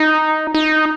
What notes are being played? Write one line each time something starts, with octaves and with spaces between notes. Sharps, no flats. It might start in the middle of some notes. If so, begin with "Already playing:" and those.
Already playing: D#4
D#4